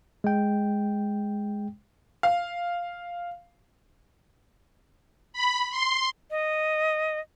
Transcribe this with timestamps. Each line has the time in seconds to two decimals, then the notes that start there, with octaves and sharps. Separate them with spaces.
0.24 G#3 G5
2.23 F5
5.33 B5
5.71 C6
6.31 D#5